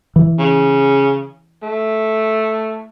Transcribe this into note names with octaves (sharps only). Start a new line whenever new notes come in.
E3
C#3
A3